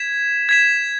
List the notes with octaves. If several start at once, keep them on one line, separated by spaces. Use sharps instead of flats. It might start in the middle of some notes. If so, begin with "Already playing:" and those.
Already playing: G#6 B6 E7
G#6 B6 E7